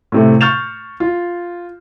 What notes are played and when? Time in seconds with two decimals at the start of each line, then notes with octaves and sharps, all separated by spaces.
0.12 A2 C3 A3
0.41 C#6 F6 G6 A6 E7 F7
1.00 F4